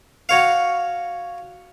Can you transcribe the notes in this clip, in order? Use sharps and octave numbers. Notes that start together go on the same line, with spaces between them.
F#4 C#5 F5